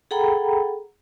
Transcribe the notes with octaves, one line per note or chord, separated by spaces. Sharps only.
G#4 A4 F#5 G5 A#5 B5